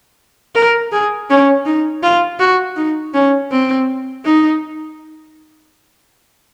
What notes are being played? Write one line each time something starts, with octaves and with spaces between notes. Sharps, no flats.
A#4
G#4
C#4
D#4
F4
F#4
D#4
C#4
C4
D#4